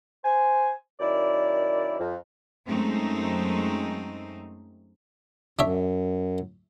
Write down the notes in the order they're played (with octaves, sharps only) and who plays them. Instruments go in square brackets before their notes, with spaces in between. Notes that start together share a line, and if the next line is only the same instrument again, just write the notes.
[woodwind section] C5 G#5
F#2 D#3 E4 D5
F2
[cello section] F#2 G#3 A3 C4 D#4
[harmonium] F#2 [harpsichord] D4 C#5 E5